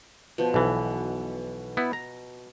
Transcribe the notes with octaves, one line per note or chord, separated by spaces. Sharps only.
B2 F3
B1 E3
B3 E4
A#5